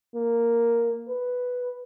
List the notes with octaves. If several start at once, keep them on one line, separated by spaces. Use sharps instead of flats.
A#3
B4